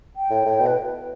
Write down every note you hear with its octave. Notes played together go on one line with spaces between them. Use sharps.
G5
A2
A2
B2
B4